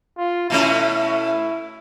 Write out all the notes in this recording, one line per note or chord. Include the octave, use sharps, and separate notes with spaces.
F4
B2 A3 C#4 E4